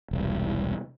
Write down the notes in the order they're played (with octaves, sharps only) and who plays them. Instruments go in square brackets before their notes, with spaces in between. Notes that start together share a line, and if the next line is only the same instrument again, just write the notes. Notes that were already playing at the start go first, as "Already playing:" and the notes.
[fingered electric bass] E1 C2